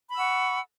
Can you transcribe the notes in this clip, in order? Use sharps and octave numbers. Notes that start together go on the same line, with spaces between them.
F#5 B5 C#6 E6